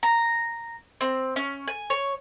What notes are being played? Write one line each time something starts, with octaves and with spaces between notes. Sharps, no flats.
A#5
C4
C#4
G#5
C#5